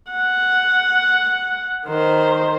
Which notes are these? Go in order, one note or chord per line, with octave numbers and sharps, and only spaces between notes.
F#5
D#3 C5